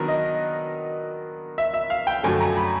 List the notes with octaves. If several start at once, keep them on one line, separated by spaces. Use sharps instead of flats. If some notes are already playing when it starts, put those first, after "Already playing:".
Already playing: D#3 F#3 B3 D4 A#4 B4
D#5
E5
E5
F5
G5
F#2 D3 F3 A3 G#5
A#5
B5